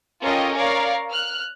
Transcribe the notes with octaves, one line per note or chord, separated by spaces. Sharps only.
C#4 F4 G4 A4 A#4 D#5
A#4 C#5 D5 F5 A#5
F6 F#6